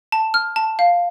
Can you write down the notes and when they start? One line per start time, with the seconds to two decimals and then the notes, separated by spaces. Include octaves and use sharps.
0.12 A5
0.34 F6
0.56 A5
0.79 F5